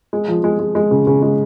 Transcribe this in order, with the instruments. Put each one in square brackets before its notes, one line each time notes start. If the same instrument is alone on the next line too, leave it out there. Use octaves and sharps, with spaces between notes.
[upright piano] G#3
F3
G#3
G#3
G#3
C#3
C#3
G#3